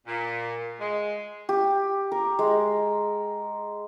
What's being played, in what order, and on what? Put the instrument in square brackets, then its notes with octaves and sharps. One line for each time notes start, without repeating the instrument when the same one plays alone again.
[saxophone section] A#2
G#3
[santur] G4
A#4
G#3